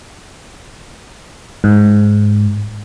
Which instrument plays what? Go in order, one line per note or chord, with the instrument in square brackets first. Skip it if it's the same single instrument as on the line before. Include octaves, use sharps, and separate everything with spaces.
[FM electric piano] G#2